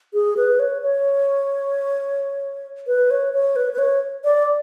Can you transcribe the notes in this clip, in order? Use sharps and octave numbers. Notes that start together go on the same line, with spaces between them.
G#4
B4
C#5
C#5
B4
C#5
C#5
B4
B4
C#5
D5